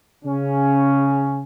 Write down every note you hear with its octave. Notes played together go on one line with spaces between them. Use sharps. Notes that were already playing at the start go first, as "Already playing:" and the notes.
C#3 C#4